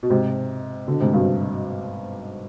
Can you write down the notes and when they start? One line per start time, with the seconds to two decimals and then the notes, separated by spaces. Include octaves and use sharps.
0.03 B2
0.10 G#2 C3
0.87 B2 D3
1.01 G#2 C3
1.13 G2 B2